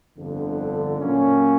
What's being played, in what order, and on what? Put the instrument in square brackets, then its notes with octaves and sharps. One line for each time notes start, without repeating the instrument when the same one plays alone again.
[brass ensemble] G1 F2 D3
A#2 F#3 A#3 C#4